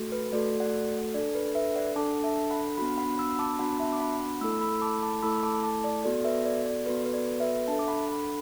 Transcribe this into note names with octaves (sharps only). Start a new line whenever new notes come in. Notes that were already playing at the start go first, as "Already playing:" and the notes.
Already playing: A3 F#4 A4
B4
A3 F#4 A4 D5
D5 F#5
D4 A4 D5
B4
B4 E5
D5 F#5
D4 A4 A5 D6
E5 A5
F#5 B5
B3 D4 F#4 F#5 B5
F#5 B5
B5 E6
A5 D6
B3 D4 F#4 F#5 B5
E5 A5
D6
F#5 B5
A3 E4 A4 B5 E6
B5 E6
B5
A5 D6
A5 D6
A3 E4 A4 B5 E6
A5 D6
A5 D6
D5
B3 F#4 A4 D5
B4 E5
D5
D5
B3 F#4 A4 B4
B4
D5
B4 E5
D4 A4 E5 A5
D6
F#5 B5
F#5 B5